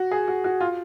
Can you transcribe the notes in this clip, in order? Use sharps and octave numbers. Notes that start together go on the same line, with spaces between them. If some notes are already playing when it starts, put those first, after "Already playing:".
Already playing: F#4
G#4
F#4
F#4
F4